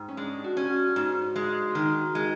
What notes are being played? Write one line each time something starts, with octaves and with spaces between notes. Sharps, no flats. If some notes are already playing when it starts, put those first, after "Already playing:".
Already playing: G#2 G4
C#4
G#3 D4
F#4
C#4
F#4
G#2
G#3
D#3 F4 F#4
G#3